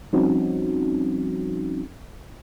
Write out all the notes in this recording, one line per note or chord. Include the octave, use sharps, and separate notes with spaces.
F3 G3 C4 C#4 D#4 F#4